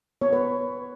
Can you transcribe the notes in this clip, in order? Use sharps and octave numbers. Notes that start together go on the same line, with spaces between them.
B3 C#5
B4